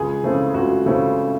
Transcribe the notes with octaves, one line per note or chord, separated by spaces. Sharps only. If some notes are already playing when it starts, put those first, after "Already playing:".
Already playing: C#2 G#4
C#3 E3 A3 C4
C#2 F#4
C#3 E3 A3 C4